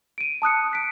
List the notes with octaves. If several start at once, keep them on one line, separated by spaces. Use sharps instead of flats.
D7 D#7
A5 D#6 F#6 C#7
B6 D7